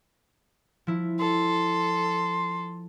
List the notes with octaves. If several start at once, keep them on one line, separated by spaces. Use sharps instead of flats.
F3 E4
A4 C6